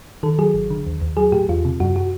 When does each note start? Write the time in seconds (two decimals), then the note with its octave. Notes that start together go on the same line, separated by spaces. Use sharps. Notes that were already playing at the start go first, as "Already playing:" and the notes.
0.23 D#3 A4
0.39 F#3 G#4
0.54 G#1
0.70 D3
0.87 D#2
1.02 D#2
1.17 F#3 G#4
1.32 A2 G4
1.49 E2 F4
1.65 C3
1.80 F#2 F#4
1.96 F#4